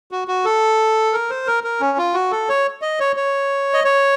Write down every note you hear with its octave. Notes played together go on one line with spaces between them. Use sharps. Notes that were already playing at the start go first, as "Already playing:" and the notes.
F#4
F#4
A4
A#4
C5
A#4
A#4
C#4
F4
F#4
A4
C#5
D#5
C#5
C#5
D#5
C#5